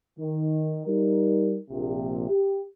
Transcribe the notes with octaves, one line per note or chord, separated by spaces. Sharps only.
D#3
G3 D#4 A#4
A#1 C3
G4